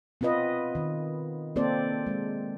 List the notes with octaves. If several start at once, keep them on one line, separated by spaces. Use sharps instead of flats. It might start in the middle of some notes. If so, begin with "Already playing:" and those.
B3 C4 F4 B4 D#5
D#3
A#3 C4 A4 C5 D5
G#3